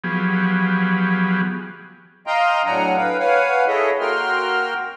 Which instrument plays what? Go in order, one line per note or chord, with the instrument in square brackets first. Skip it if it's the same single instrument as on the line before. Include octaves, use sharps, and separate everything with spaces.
[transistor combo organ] F3 F#3 B3 G4 G#4
[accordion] D#5 F5 G5 A#5 C6
A2 F#3 D4 F#5 G#5 A#5
B4 F5 G5
B4 C#5 F5 F#5 G#5
E4 G#4 A4 C#5 D#5 E5
A#3 F#4 A#4 G5 C6 F6